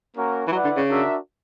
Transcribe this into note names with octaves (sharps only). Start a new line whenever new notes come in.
A#3 C#4 F#4 A#4
E3
F#3 E4 B4 D5 F#5
D3
C#3
D4 F#4 A#4 E5